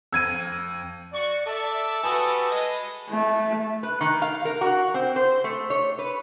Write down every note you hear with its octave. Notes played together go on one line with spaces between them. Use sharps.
F2 E6 G#6 D#7
F#4 D5 C#6
A4 D5 E5
G3 F#4 A4 B4 G#5 A5 D#6
G#3 D#5
A3
B4
D#3
F5
A#4
F#4
C4
C5
A3
C#5
B4